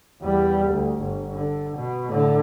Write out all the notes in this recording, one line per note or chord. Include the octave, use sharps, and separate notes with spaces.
E2 G3
D2
G1
D3
B2
A2 D3